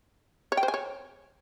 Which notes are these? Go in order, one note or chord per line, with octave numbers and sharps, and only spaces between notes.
C#5
G5
C5
G#5
C#5